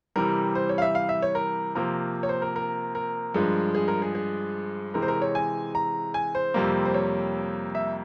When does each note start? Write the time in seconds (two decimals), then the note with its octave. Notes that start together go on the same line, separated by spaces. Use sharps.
0.16 C3 E3 G3 A#4
0.55 C5
0.69 C#5
0.78 F5
0.82 E5
0.95 F5
1.09 E5
1.22 C#5
1.35 A#4
1.75 C3 F3 A#3 A#4
2.23 C#5
2.29 C5
2.42 A#4
2.56 A#4
2.95 A#4
3.34 G2 F3 G#3
3.75 G#4
3.88 A#4
4.02 G#4
4.15 G#4
4.94 C3 E3 G#3 A#4
5.02 C5
5.08 A#4
5.22 C#5
5.35 G#5
5.75 A#5
6.14 G#5
6.35 C5
6.54 F2 C3 G3 A#3
6.86 C5
6.94 C#5
7.75 E5